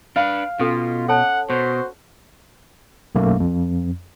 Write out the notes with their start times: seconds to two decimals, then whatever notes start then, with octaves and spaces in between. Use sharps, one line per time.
0.16 D4 B4 F5
0.59 B2 C#4 F4 A4
1.09 A4 C#5 F#5 A5
1.50 B2 F#4 C5
3.15 B1 F#2 A3 A#3
3.40 F2